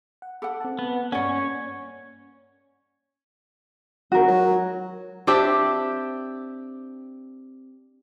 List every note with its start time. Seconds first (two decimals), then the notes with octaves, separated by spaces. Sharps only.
0.22 F#5
0.42 A4 F#5 B5 D6 F#6
0.60 C4 A5
0.79 B3
1.12 G2 A#3 C#4 C#5 D5 F#5
4.12 G#1 F#4 A#4
4.28 F#3
5.27 C4 D4 G4 E5